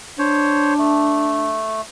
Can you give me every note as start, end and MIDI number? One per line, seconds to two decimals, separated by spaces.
0.19 1.59 62
0.19 0.74 72
0.19 0.74 73
0.79 1.81 57